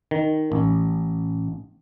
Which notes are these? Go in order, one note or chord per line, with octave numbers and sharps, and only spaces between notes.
D#3
A1